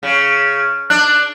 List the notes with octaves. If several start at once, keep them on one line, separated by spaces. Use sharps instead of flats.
C#3
D4 F#6